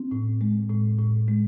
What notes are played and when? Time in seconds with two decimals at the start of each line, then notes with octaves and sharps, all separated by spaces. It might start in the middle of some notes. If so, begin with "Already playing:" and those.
Already playing: C4
0.11 A2
0.41 G#3
0.70 A2
0.99 A2
1.28 G#3